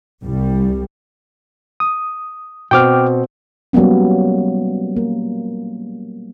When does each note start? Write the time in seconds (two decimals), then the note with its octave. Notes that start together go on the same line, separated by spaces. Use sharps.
0.23 C2 G3
1.80 D#6
2.71 B2 C4 G5 D6 F6
3.73 F#3 G3 A#3 B3 C#4
4.97 A#3